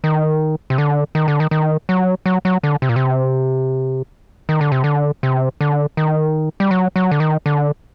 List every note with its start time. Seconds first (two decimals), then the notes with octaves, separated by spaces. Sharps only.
0.04 D#3
0.70 C3
0.78 D3
1.15 D#3
1.28 D3
1.40 D#3
1.51 D#3
1.89 F#3
2.26 F#3
2.45 F#3
2.63 D3
2.82 C3
2.89 A#2
2.96 C3
4.49 D#3
4.61 D3
4.72 C3
4.84 D3
5.23 C3
5.61 D3
5.97 D#3
6.60 G3
6.71 F#3
6.96 F#3
7.11 D3
7.20 D#3
7.46 D3